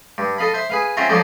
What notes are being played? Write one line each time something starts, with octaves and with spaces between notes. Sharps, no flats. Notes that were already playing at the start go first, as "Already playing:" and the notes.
G2
A4 D#5 F5 B5
C5 E5
G#4 B4 F5
C4 C#4 F4 F#4 E5 A#5
F3 F#3 D#4 A4 C5 D5